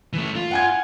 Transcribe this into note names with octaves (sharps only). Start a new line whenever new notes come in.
E3 A3
F4
F#5 G#5 G#6